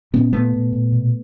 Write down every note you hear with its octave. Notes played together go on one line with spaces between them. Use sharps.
A#2 B3 C#4
A#2 A3 B3
A#2
A#2
B2